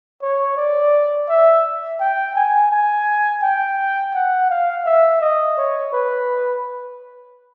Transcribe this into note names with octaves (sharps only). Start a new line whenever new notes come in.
C#5
D5
E5
G5
G#5
G#5
G5
F#5
F5
E5
D#5
C#5
B4